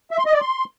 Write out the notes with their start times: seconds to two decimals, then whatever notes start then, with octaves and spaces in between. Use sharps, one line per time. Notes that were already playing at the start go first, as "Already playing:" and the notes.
0.11 E5
0.18 C6
0.26 D#5
0.33 D5
0.41 C6